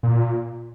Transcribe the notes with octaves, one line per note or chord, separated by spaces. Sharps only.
A#2